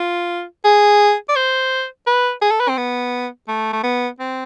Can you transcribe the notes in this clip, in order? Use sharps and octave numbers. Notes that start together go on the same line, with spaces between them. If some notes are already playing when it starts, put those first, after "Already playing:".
Already playing: F4
G#4
D5
C5
B4
G#4
A4
B4
C4
B3
A3
A3
B3
C4